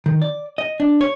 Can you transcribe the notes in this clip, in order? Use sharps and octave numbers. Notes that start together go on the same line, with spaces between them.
D#3
D5
D#5
D4
C#5